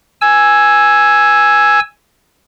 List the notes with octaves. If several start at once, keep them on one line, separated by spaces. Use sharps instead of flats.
G#5 E6